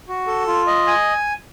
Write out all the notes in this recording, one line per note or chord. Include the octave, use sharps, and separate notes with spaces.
F#4
A4
F4
D#5
G#5